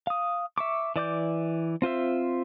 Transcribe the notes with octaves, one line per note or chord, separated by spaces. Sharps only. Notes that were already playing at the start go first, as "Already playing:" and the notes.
F5 D#6
E5 C#6 D6
E3 D5 D6 G6
C4 F4 C5 E5